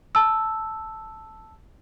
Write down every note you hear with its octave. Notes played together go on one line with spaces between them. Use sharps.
A5 E6